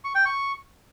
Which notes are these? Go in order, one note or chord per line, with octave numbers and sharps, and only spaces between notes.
C#6
G5
C#6